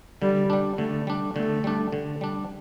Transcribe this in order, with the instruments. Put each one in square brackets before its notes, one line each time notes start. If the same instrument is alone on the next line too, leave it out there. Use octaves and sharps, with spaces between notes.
[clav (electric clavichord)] D3 [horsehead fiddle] G3
[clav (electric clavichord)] G3 D4
[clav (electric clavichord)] D3 [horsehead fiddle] A3
[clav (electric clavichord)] G3 D4
[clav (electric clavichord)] D3 [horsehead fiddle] A3
[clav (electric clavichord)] G3 D4
D3
G3 D4